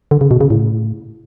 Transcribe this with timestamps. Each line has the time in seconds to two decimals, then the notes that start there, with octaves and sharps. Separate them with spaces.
0.11 D3
0.21 C#3
0.31 B2
0.41 C#3
0.50 A2